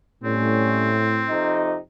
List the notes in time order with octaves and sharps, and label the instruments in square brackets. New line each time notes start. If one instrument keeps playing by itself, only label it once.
[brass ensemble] A2 [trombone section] G3 C#4 [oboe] C4
[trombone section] F2 C3 D#4